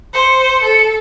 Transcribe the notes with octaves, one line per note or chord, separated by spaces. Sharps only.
C5 C#7
A4